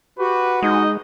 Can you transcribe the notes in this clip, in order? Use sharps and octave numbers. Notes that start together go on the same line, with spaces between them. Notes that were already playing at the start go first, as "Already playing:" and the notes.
F#4 G4 B4
G#3 D#4 D#5